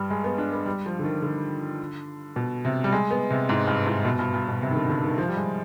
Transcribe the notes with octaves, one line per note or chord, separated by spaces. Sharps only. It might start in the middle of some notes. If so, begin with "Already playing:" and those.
Already playing: G2 G3
G#3
B3
D4
B3
G3
F3
D3
D#3
D3
B2
C3
G3
G#3
B3
C3
G#2
G2
G#2
B2
G2
G2
B2
C3
D#3
D3
D3
D#3
F3
G3
G#3